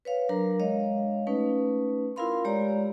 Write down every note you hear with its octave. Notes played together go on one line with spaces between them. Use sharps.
B4 C#5 F5
F#3 D4 A#4 A#5
G#3 C#5 D#5 F5
A3 C#4 D#4 B4
E4 F4 A#4 F5 B5 C6
G#3 G4 C#5 D5 A#5